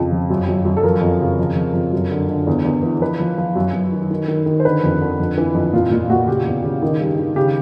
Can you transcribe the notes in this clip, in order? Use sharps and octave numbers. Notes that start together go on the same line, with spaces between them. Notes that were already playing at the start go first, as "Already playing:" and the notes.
Already playing: F2 C#3 F3
F3
F#2
F#2
F#2
A4
F3 A#4
F2
C#3
F2
F3
F2
F#2
D3
D3
E2
E2
E3
F3 B4
F3
F3
F#2
F#2
D#3
D#3
D#3
D#3
C5
D3 B4
F2
D3
F2
E3
F2
A#2 F4
A#2 F4
A#2 F#4
C#3 G4
E2
C#3
D#3
G2
D#3
C#3 G4